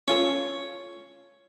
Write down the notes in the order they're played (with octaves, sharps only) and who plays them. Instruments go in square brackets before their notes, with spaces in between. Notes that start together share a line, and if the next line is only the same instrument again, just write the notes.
[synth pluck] C#4 F4 A4 [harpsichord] C#5